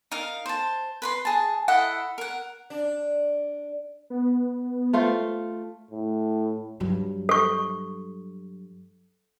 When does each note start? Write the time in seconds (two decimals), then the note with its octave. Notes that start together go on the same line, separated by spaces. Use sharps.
0.11 D#4 A#4 F5
0.46 C5 A5
1.02 B4 B5 C6
1.25 G#4 A5
1.68 E4 A4 D#5 F#5
2.18 A#4 F#5
2.70 D4
4.10 B3
4.93 A3 F4 C5
5.91 A2
6.80 G2 F#3
7.29 A4 C#6